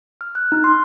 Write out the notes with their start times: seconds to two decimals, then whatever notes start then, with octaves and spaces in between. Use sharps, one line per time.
0.21 F6
0.35 F#6
0.52 D#4
0.64 C6